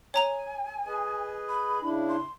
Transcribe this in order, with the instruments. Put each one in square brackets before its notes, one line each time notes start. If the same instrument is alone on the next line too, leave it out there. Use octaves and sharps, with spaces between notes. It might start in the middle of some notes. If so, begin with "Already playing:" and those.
[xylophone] C#5 A#5 F7 [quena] G#5
[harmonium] G#4 B4 D#5
[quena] B5
[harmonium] C#3 D4 E4
[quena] C6